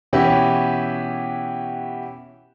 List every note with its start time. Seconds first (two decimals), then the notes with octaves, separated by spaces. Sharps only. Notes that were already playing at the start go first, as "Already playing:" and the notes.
0.13 B2 E3 C#4 E4 F#4 G4